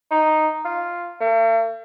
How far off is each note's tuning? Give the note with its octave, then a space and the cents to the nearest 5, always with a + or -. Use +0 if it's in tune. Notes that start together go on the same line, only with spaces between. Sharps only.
D#4 -5
F4 -5
A3 +45